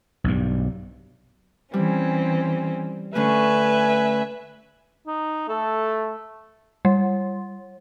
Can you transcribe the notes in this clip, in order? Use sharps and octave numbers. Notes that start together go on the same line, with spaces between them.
B1 G2
E3 G3 C4 C#4
D3 A3 C#4 B4 E5 G#5
D#4
A3 A4
G3